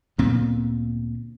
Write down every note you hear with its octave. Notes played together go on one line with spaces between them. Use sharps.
D2 A#2 B3 C4